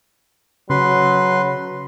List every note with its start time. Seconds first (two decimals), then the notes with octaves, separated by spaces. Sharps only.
0.70 C#3 F#3 B4 C6